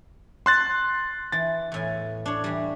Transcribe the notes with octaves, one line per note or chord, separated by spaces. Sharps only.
A5 C6 F#6 A6
E3 A6
E2 A2 G#5
D4 C#5
E3 G3